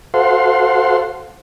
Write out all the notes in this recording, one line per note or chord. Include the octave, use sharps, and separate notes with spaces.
F#4 A4 C5 F5 F#5 C6